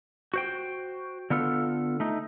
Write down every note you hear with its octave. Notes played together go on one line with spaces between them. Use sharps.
F#4 C5 G5
D3 B3 F4 A4
A3 D#4